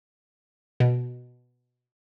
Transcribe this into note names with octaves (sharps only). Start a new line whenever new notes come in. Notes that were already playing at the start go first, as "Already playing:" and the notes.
B2